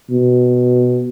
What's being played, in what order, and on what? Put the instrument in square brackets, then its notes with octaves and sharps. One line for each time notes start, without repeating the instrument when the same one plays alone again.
[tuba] B2